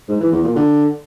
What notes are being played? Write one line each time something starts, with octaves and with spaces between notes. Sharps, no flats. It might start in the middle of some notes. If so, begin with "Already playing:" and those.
G#2
E3
E2
A#2
D3